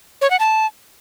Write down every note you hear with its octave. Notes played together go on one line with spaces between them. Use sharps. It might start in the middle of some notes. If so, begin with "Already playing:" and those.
C#5
F#5
A5